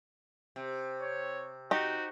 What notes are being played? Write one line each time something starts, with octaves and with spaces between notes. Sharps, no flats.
C3
C#5
D#4 F#4 G4